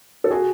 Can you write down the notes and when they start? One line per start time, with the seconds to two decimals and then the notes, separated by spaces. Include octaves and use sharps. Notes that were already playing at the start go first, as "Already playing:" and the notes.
0.24 A4
0.31 F#4 G#4